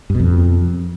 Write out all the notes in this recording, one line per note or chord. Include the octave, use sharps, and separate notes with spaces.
G2
B2
F2